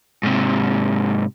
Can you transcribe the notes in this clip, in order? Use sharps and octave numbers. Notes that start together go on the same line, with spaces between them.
G#2 C3